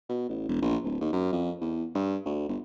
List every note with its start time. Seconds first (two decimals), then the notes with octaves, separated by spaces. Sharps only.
0.09 B2
0.29 A1
0.48 E1
0.62 A#1
0.84 D1
1.01 D#2
1.13 F#2
1.32 F2
1.61 E2
1.95 G2
2.26 D2
2.49 G1